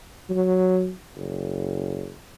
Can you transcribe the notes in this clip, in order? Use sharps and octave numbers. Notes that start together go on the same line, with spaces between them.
F#3
F#1